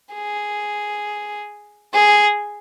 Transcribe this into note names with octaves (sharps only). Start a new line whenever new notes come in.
G#4
G#4